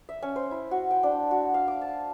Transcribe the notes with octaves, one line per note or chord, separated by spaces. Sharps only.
E5
C#4
C5
E4
F#4
G5
D4
F#4
F5
D6
A5